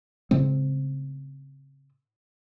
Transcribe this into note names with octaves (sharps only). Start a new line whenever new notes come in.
A2 C#3 G#3 C4